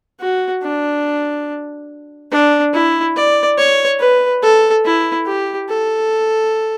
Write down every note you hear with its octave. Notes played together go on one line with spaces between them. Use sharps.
F#4
D4
D4
E4
D5
C#5
B4
A4
E4
G4
A4